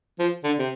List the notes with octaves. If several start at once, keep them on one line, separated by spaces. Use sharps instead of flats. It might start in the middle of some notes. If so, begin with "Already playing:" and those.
F3
D3
C3